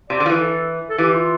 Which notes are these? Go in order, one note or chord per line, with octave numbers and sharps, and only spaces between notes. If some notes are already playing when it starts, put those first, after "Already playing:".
C3 D5
D3
F3
E3
A4
A4
E3 G4
F4